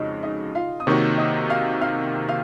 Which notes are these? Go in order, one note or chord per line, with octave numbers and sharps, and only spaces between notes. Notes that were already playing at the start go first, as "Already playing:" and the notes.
Already playing: F2 C#3 G#3 D#4 F#4 D#5
D#4 D#5
F4 F5
D#6
C3 D#3 A#3 D#4 F#4 C#5 C#6
D#5 D#6
F5 F6
F5 F6
F5 F6